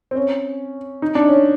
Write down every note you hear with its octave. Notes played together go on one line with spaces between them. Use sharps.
C4
C#4
D#4
D4
C#4